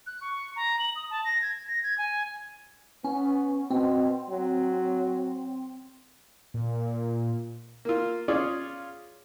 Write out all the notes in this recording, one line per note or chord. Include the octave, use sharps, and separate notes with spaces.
F#6
C#6
A#5
F#7
D#6
A5
A#6
G#6
A#6
G#6
G#5
B3 C#4
B2 C4
F#3
A#2
A#3 F4
C#4 F4 G#4 C#5 D5